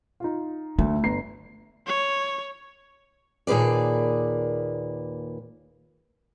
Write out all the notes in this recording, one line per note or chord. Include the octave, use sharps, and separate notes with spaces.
D#4 F4
D2 A3
G1 A#5 C7
C#5
D#2 A#2 G#4 B4 D5